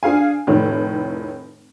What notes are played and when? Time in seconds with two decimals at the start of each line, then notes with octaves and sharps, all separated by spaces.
0.03 D4 G#4 F5 G#5
0.47 F1 A2 D#3 C#5